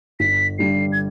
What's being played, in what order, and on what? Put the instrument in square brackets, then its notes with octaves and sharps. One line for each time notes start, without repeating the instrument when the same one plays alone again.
[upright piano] G1 [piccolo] B6
[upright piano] G2 D3 G3 [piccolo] C7
[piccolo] G#6